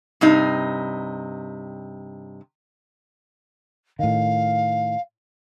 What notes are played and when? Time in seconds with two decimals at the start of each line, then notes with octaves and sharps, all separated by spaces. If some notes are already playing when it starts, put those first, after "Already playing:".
0.21 G2 C3 D#4
3.99 A2 D#3 F5